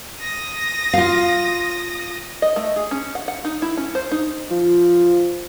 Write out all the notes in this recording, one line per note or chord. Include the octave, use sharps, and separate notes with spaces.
D#6 A#6
F4 F5
D#5
A3
G#4
C#4
F#5
F#5
D#4
E4
C#4
C5
D#4
F3